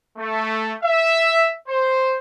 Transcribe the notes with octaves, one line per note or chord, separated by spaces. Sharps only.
A3
E5
C5